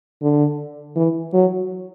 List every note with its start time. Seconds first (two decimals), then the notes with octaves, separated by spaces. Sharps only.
0.22 D3
0.96 E3
1.33 F#3